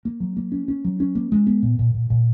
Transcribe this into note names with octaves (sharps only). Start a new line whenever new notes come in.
A#3
F#3
A#3
C#4
C#4
F#3
C#4
A#3
G#3
B3
A#2
A#2
A#2
A#2